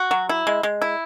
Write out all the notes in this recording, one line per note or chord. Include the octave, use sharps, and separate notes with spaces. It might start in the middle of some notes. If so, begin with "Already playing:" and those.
Already playing: F#4
F#3
E4
G#3
G#3
E4